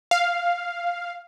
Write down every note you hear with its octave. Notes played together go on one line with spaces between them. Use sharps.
F5